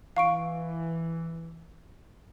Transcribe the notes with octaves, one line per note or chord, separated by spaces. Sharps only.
E3 F5 C#6 D7